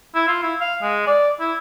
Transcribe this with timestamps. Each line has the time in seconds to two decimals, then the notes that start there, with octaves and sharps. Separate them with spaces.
0.16 E4
0.28 F4
0.43 E4
0.61 F5
0.82 G#3
1.07 D5
1.40 E4